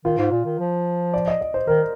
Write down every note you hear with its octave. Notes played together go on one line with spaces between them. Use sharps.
D#3 F4
G#2
A#2
D#3
F3
D5
D#5
D#5
C5
D#3 A#4